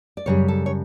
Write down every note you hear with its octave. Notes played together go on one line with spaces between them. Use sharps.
D5
F#2 C#3 G3 C#5
A4
C#5